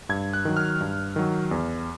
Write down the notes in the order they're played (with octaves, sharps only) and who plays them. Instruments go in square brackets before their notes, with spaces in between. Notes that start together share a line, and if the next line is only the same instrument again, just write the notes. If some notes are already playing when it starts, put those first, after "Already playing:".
[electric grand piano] G2 G#6
F#6
D#3 F#3
F6
G2
D#3 F#3
E2